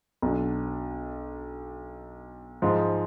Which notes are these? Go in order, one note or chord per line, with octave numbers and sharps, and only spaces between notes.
B1 B2 F#3 D4
G#2 F3 G#3